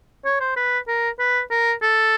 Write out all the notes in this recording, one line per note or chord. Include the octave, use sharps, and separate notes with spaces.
C#5
C5
B4
A#4
B4
A#4
A4